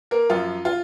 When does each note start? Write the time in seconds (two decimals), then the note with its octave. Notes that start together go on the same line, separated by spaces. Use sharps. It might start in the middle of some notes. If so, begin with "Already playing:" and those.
0.11 A#3 A#4
0.30 F#2 F3 F4
0.65 F4